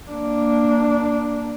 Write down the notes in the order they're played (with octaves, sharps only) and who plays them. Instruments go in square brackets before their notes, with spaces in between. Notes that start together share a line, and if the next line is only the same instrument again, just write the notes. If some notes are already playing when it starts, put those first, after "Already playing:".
[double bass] A#3 D4